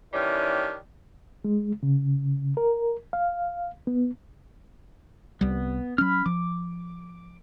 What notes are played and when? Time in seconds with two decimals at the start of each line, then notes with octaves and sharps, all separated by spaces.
0.13 D#3 E3 G3 C#4 D4
1.44 G#3
1.83 C#3
2.57 A#4
3.13 F5
3.87 B3
5.41 C2 G3 B3
5.98 F#3 C#4 B5 F6
6.26 F3 D6